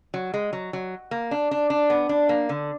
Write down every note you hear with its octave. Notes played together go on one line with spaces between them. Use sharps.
F#3
G#3
F#3
F#3
A#3
D4
D4
D4
B3
D4
A#3
D3